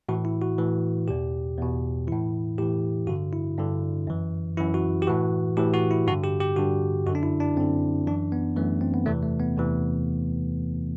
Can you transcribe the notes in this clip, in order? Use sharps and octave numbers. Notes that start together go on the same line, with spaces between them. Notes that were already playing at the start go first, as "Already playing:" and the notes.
A2 E3 F#4
E4
F#4
A2 E3
E2 B2 G4
E2 B2
A2 E3 E4
A2 E3 G4
G2 D3 F#4
E4
G2 D3
F#2 E3
F#2 E3 E4
F#4
G4
A2 E3 F#4
A2 E3 G4
F#4
E4
G2 D3 F#4
G4
G4
G2 D3 F#4
F#2 D3 F#4
D4
E4
D4
F#2 D3 C4
F#2 E3 D4
B3
F#2 E3 A3
C4
B3
E2 C3 E3 A3
A3
B3
E2 C3 E3